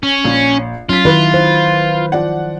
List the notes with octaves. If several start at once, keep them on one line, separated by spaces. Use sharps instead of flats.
C#4
A#1
F#3 C#4 F4 B6
D#3 E4 B4
C5
F3 D5 F#5